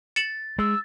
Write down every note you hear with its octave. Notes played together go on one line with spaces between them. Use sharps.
A6 C#7 E7 F#7
G#3 E6